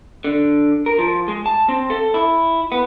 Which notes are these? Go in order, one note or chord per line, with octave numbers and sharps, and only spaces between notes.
D3
A#4
F3
G#3
A5
C4
A4
E4
B3